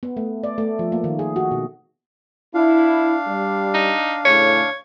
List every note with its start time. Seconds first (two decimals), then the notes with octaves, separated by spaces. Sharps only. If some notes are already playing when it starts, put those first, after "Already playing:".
0.03 B3
0.17 A3
0.44 D5
0.58 A3
0.79 F3
0.92 A#3
1.04 D#3
1.19 G#4
1.36 F#4
1.51 B2
2.54 D4 E4 F5
3.27 G3
3.74 D#4
4.25 A2 C#3 C#5